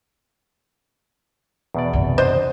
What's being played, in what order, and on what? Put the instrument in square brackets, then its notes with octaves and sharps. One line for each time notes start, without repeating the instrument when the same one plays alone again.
[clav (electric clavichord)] E2 B2 D5
[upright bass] F#2 C3
[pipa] D4 C5 D#5